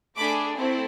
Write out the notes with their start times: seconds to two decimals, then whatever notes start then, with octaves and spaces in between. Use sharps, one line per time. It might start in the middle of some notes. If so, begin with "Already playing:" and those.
0.16 A3 D4 G#4 B5 D6
0.57 A3 C4 E4